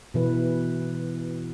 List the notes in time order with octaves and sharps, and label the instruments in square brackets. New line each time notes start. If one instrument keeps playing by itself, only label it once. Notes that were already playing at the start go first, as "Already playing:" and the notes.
[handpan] B2 E3 B4